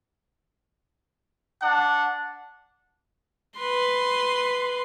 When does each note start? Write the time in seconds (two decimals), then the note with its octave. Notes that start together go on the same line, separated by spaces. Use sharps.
1.61 D4 F#5
3.58 B4 C6